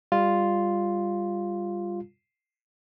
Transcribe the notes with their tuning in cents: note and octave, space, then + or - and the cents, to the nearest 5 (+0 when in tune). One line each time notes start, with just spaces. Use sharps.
G3 +20 F4 +0